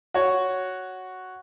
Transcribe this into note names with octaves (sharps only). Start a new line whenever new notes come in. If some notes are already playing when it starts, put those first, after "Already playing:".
F#4 C#5